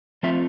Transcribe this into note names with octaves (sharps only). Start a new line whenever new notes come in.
F3 A3 C4 F4 E5